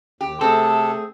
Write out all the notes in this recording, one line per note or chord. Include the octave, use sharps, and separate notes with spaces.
D#2 G4
C3 A3 C4 G#4 A4